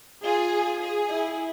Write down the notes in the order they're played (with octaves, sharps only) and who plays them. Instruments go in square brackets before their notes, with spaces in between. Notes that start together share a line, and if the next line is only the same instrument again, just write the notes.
[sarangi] F4 [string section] G#4
[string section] G#4
[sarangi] E4